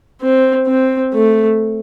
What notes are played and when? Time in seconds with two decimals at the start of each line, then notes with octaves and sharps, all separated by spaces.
0.21 C4
0.67 C4
1.13 A3